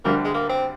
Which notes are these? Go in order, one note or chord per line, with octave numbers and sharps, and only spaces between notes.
D2 D3 G3 A#3 D4 G4
G#3
A#3
C4